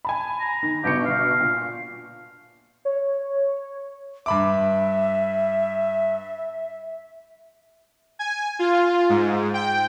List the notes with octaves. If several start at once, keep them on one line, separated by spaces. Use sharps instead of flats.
G#5 A5 B5
A#5
D#3
G1 B2 G4 C#7
F5
A#2
C#5
G2 E5 B5 D6
G#5
F4
G#2
G5